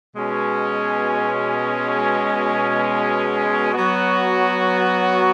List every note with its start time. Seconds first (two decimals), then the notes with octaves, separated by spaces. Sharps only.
0.14 B2 G#3 C#4
3.73 F#3 B3 F#4